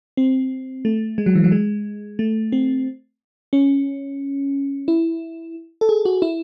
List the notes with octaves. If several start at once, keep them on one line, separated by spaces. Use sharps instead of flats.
C4
A3
G#3
F#3
E3
F#3
G#3
A3
C4
C#4
E4
A4
G#4
F#4
E4